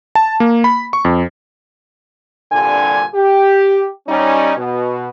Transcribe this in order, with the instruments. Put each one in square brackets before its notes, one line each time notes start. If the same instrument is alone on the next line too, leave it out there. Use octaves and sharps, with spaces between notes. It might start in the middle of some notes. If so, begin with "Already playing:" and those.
[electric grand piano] A5
A#3
B5
C#6
F2
[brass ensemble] C2 G2 A#2 D3 G#5
G4
G3 C#4 D#4
B2